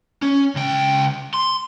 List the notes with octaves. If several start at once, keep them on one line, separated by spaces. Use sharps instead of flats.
C#4
C#2 G5
C6